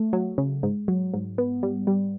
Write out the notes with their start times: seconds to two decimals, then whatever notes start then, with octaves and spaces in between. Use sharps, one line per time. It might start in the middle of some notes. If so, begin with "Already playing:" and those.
Already playing: A3
0.13 F#3
0.38 C#3
0.63 G#2
0.88 F#3
1.14 G#2
1.38 B3
1.63 G3
1.87 G3